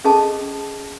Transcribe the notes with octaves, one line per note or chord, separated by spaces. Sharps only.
C#4 G#4 A4 D#5 A5